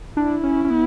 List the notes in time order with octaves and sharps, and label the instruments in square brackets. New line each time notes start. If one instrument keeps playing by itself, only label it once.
[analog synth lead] D4 [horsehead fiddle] E4
[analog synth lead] C#4
C#4
B3